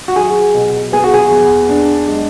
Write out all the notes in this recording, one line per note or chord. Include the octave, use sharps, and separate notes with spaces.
F#4
F#3 G#4
B2
B3 G#4
F#4
G#4
E2
D4
G#3